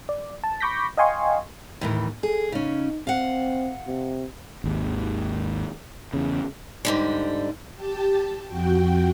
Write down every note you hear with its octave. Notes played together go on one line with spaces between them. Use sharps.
D5
A5
B5 C#6 D6 G6 A#6 B6
D#5 F5 G5 G#5 C6 C#6
D#2 A2 E3
G#4 A4
C#3 C#4 D#4
C4 F5 F#5
C3
G#1 D#2
E2 C#3
G#2 D3 G3
G4 A5
F2 F#4 G5